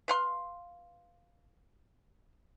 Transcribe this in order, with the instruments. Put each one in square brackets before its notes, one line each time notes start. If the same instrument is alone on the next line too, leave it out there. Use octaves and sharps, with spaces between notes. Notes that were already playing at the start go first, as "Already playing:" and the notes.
[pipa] B4 F5 C6